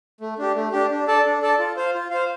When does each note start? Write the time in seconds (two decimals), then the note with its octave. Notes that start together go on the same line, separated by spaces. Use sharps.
0.21 A3
0.38 D4 G4
0.55 A3
0.72 D4 G4
0.91 D4
1.08 A4 D5 A5
1.25 D4
1.42 A4 D5 A5
1.59 F4
1.77 C5 F5
1.94 F4
2.11 C5 F5